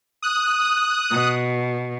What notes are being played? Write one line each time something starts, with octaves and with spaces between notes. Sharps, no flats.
D#6 F#6
B2